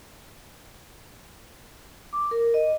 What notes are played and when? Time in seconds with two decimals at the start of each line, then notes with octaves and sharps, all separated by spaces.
2.13 D6
2.31 A#4
2.54 D#5